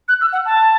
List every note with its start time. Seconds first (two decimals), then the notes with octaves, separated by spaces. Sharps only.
0.08 F#6
0.21 E6
0.33 F#5
0.46 A5